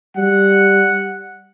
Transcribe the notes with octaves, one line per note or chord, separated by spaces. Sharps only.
G3 F#5